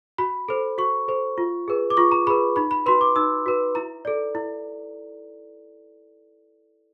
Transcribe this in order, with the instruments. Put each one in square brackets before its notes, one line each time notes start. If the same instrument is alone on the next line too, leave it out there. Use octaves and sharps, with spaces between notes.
[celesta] F#4 B5
A4 C5
F#4 C#6
A4 C5
F4
G#4 B4
D6
F4 C#6
A#5
G#4 B4 B5
D#4 B5
B5
F#4 B4 C6
D6
D#4 E6
F#4 B4
E4 A#5
A4 D5
E4